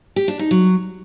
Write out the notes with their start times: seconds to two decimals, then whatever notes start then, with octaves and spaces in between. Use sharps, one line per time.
0.16 G4
0.28 D4
0.39 D#4
0.51 F#3